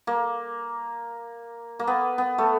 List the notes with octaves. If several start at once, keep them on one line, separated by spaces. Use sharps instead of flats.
A#3
A#3
B3
B3
A3